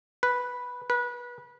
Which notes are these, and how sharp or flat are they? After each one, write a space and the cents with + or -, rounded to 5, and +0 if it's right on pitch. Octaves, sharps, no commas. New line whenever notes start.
B4 -5
B4 -25